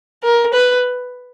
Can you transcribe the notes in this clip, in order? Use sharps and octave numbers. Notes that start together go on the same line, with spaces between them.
A#4
B4